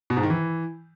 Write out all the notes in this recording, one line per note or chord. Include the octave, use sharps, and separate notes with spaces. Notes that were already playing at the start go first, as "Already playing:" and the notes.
B2
G#2
D#3
E3